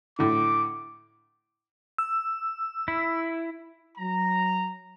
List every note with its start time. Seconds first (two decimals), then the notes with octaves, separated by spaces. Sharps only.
0.19 A2 D3 D6
1.98 E6
2.88 E4
3.98 F#3 A#5